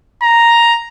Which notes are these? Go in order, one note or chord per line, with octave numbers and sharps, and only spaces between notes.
A#5